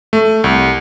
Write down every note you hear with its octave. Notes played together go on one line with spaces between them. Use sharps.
A3
C2